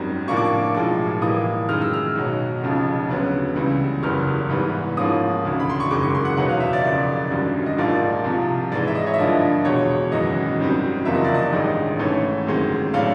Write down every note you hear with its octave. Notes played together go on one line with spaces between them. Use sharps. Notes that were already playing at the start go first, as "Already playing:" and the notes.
Already playing: G#1 F#2 D#3 G3 C4
A2 F3 A#3 D4 C#6
D6
C#6
B1 A2 F3 G#3 D6
A2 E3 G3 A#3 D#6
F#2 D#3 G#3 F6
E6
F6
B1 B2 F#3
F1 F2 C#3 F3
D2 C#3 F#3 B3
C#2 C#3 E3 G3
F#1 E2 C#3 E3 G3 F6
G#2 E3 G3 B3
G#2 F3 A#3 C#4 D#6
E1 D2 C#3
B5
C6
C#6
F#1 F#2 D#3 G#3 D6
C#6
C6
F#5
E2 B2 F#3 B3 D#4 F#5
F5
E5
D5
F#1 F2 C#3
G#1 F#2 D3 G3
D#5
A#1 G#2 F3 A#3 D5
C2 C3 F3
G#2 E3 G#3 D5
E5
D#5
C#5
E5
G2 D3 F3 A#3 D#5
E2 B2 G#3 C#5
G#1 F#2 C#3 E3 D#5
G#1 F#2 D#3 G3 C4
F#1 E2 C3 F3 A#3 E5
D#5
D5
D#5
A1 G2 D#3 G#3
G#2 E3 A3 C#4
G1 F#2 D#3 G#3 C4
A2 F#3 A3 D4 F5